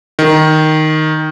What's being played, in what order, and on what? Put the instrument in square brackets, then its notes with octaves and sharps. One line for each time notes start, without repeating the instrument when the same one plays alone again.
[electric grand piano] D#3